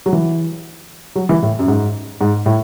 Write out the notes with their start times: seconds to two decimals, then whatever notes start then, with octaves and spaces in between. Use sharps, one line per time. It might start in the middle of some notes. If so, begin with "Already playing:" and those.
0.06 F#3
0.13 E3
1.16 F#3
1.29 E3
1.42 A2
1.59 F#2
1.68 G#2
2.21 G#2
2.46 A2